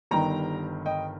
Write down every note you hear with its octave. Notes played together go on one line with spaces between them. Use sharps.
G1 G2 D#3 G5 A#5
D#5 G5